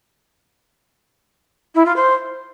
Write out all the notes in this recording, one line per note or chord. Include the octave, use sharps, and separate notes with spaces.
E4
F4
C5